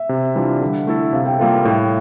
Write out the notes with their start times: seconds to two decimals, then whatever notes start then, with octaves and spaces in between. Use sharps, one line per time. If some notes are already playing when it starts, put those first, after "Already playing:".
Already playing: E5
0.09 C3
0.35 E3 G3 D4 F4
0.61 D3
0.87 A3 E4 A4
1.13 C3 F5
1.26 G5
1.39 G3 A#3 F4 A4 F5
1.65 A2